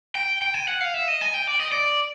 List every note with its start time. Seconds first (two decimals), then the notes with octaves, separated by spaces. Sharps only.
0.15 G5
0.42 G5
0.54 G#5
0.68 F#5
0.81 F5
0.94 E5
1.08 D#5
1.21 G#5
1.34 G5
1.47 D5
1.60 D#5
1.72 D5